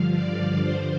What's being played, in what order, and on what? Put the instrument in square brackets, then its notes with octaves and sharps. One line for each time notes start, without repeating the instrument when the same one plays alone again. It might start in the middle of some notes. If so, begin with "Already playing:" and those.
Already playing: [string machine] G2 D3 F3 F5
D5
G2 D3 F3 C5